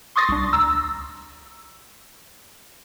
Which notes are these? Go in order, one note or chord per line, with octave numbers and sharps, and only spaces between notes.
C6 C#6 D#6 A6 A#6 C7
C2 D4
D2 A#5 E6